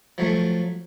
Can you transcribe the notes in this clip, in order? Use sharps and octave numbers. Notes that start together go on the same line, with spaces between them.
F3 F#3 A3